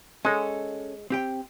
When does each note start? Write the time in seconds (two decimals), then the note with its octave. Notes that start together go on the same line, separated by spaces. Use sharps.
0.25 G#3 C#4 A4
1.10 C4 G4 G5